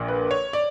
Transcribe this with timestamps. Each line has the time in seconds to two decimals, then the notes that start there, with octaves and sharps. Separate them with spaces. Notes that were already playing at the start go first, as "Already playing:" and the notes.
Already playing: A#1 A#2 A#3
0.08 B4
0.31 C#5
0.53 D5